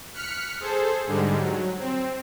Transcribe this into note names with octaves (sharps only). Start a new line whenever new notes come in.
F6 F#6 B6 C#7
G#4 A4 C5
G#2 D3 G3 G#3
F#3
C4